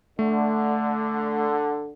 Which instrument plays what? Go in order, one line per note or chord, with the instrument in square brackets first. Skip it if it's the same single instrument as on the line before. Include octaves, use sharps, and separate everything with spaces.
[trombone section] D3 [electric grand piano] A3